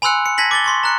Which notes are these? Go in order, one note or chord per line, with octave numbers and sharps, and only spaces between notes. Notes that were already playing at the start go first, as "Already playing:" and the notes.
G#5 B5 C6 E6 F#6 C#7
C#7
A5 G#6 A#6 B6 F#7
D6 A6 G7
C6 C#6 A6
A#5 F#6 C#7